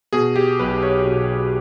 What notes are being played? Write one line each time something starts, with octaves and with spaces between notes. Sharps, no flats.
B2 G#4
G4
B1 B4
C#5
B2